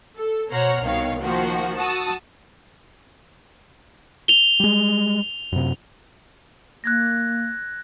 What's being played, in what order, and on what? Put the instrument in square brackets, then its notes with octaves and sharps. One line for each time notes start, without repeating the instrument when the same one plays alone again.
[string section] A4
B2 C5 C#5 F#5 A#5 F6
C2 B2 D#3 C#5 F5
D#3 F3 A#3 F#4
F#4 A5 D#6 E6
[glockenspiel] F7 G7
[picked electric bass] G3 G#3
F#2 C3
[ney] A#3 [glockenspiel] F#6 G#6 A#6